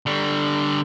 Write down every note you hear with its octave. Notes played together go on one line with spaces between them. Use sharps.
D3 G3